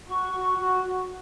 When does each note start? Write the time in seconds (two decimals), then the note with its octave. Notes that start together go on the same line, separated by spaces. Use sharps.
0.07 F#4 C#6
0.31 F#4
0.57 F#4